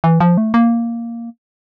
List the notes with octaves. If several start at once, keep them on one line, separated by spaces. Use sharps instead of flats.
E3
F3
A3
A#3